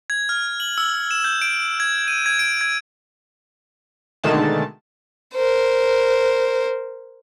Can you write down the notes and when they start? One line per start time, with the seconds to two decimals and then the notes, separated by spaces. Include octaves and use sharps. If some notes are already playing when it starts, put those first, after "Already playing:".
0.10 G#6
0.29 F6
0.60 F#7
0.78 E6
1.11 E7
1.24 G6
1.42 D7
1.80 G#6
2.08 D#7
2.26 G#6
2.39 D7
2.61 G#6
4.23 B2 D3 D#3 G#3 A3 A5
5.34 A#4 C5